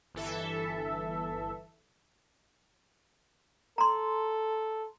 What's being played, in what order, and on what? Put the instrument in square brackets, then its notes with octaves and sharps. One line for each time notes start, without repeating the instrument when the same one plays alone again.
[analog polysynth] G1 E3 A4 E5
[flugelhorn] A4 [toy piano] A#5 C6